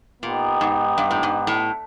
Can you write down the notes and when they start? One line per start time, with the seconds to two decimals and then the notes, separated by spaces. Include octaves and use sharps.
0.22 A#2 B3 D#4 G4
0.61 G#2
0.98 G2
1.11 A2
1.23 G#2
1.47 A2